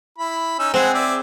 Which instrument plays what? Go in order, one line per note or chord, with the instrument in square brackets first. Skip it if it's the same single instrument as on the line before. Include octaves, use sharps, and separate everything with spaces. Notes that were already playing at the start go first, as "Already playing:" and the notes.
[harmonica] E4 B5
C#4 D#4 E6
[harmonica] G#3 F#5 G#5 [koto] C4 G#4
[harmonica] D5 E5